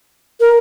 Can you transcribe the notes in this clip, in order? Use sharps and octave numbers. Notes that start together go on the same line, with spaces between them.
A#4